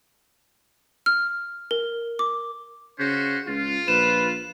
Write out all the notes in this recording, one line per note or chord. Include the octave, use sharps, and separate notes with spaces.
F6
A#4
D6
C#3 C#4 F#4 C5
C#2 F4
A#1 B4 E7